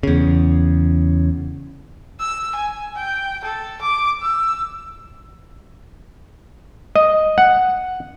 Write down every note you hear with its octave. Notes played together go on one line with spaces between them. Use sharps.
E2 C#3
E6
G#5
G5
A4
D6
E6
D#5
F#5